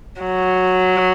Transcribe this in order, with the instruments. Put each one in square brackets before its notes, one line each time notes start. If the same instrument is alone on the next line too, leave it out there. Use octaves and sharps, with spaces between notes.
[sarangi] F#3